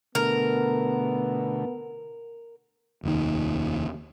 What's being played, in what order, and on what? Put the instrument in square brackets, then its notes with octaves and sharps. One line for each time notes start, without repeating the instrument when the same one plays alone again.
[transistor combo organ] B2 D3 A3 [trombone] B3 [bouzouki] A#4
[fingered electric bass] F1 D#2 D#3